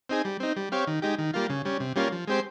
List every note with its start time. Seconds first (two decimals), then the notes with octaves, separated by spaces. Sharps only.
0.10 C4 D#4 G#4
0.25 G3
0.40 C4 D#4
0.56 G3
0.72 C4 G4 C#5 F5
0.87 D#3
1.02 G#3 D#4 G4
1.19 D#3
1.34 G3 A#3 F4
1.50 C#3
1.65 G3 C#4
1.80 C3
1.96 G3 A#3 C#4 F4
2.12 F3
2.27 G#3 C4 G4 C5